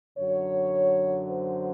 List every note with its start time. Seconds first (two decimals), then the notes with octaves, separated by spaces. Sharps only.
0.18 F#2 D3 F#3 C#5
1.29 C5